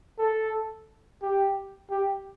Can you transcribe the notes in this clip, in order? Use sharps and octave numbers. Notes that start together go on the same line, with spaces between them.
A4
G4
G4